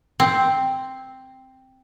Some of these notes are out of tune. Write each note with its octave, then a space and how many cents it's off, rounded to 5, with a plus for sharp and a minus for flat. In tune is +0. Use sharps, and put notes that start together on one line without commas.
C4 +0